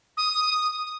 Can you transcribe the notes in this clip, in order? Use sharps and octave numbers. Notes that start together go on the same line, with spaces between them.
D#6